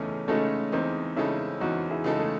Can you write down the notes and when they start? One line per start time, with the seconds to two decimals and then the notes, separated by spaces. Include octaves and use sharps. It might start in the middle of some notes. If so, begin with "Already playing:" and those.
Already playing: E2 C#3 A3 C#4 D#4
0.28 C#3 G#3 A3 C#4 D#4 A4
0.72 E2 C4 D#4
1.16 C#3 G#3 C#4 D#4 E4 A4
1.60 E2 D#4 F#4
1.90 E4 G#4
2.04 C#3 G#3 D#4 A4
2.20 A3